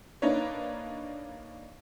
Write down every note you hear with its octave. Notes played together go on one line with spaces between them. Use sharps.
A#3 D4 D#4 B4 C#5